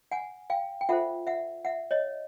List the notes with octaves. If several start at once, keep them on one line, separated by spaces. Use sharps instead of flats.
F#5 G#5
F5 G5
G5
F4 A4 C5 E5 F#5
E5 F#5
E5 F#5
C#5 D#5